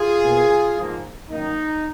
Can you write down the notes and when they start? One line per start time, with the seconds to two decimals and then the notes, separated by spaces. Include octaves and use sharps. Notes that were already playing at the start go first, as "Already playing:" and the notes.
Already playing: F4 G#4
0.24 B2 A#3
0.77 G#2 F3 A#3
1.30 F#2 D#3 A#3 D#4